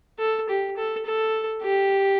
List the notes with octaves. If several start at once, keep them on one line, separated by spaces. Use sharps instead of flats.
A4
G4
A4
A4
G4